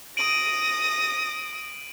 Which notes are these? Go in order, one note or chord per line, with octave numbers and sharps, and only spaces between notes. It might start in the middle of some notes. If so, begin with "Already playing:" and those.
D#6 A#6 D7 D#7 F#7